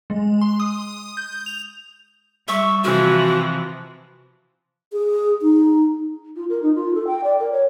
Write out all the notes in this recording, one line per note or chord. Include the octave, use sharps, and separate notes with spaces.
G#3
C6
D#6
G6
F7
G3 E5 C#6
C3 E3 F3 F#4
G#4
D#4
F4
A#4
D#4
F4
A4
G5
D5
A#4
C#5